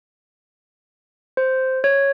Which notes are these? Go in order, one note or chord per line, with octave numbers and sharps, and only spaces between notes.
C5
C#5